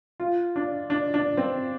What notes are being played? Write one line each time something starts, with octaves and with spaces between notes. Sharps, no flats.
F4
D4
D4
D4
C4